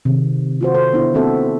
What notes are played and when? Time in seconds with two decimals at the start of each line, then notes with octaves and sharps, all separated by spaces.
0.05 C3 D#3
0.61 F4 F#4 C5
0.74 F#4 A4 C5
0.93 B3 D4 E4
1.14 A#3 C4 F#4 A4 E5